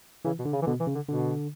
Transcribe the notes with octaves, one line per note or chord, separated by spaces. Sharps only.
C#3 E3
B2
D3
C#3
E3
B2 D3
E3
C#3
D3
B2 D3